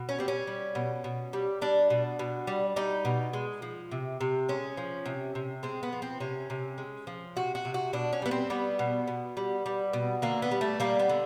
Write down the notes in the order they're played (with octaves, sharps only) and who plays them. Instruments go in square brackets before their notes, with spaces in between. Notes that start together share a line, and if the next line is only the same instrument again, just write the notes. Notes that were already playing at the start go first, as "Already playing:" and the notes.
Already playing: [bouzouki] B2
C#4
G3 C4
C#4
G3
B2
B2
G3
G3 D4
B2
B2
G3
G3 D#4
B2
G#3
F3
C3
C3
G#3 C#4
F3
C3
C3
G#3 C4
B3
F3
C4
C3 C#4
C3
G#3
F3
C3 F#4
F#4
C3
F#4
B2 D4
C#4
G3 B3
C4
G3 B3
B2
B2
G3
G3
B2
D3 A#3
B3
G3
A3
G3 A#3
B3
D3